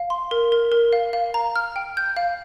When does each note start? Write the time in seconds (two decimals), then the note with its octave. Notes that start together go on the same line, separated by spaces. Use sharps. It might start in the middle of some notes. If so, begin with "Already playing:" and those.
Already playing: F5
0.10 C6
0.31 A#4
0.52 A#4
0.72 A#4
0.93 F5
1.13 F5
1.34 A#5
1.56 F6
1.76 G5
1.97 G6
2.17 F5